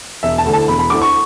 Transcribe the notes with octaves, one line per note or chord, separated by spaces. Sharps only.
E1 E5
A5
D2 D3 A3 E4
A5
E1 B5
B5
D2 D3 A3 E4 D6
C#6